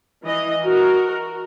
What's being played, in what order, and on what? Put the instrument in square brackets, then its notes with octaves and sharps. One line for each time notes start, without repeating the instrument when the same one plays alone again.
[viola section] E3 D#5
F#4 A#4